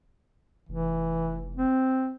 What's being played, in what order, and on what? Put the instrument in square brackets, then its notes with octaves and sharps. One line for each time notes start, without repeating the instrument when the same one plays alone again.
[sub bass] F1 [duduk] E3
[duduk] C4